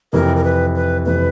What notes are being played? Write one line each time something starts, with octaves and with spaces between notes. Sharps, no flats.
F2 C3 E3 A#4
A#4
B4
B4
F2 C3 E3 B4